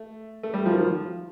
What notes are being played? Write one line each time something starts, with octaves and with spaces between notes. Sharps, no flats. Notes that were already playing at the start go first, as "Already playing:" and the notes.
Already playing: A3
A3
G3
F3
D#3
F3